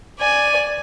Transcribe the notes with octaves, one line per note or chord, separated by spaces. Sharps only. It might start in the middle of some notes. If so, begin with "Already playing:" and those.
D5 G#5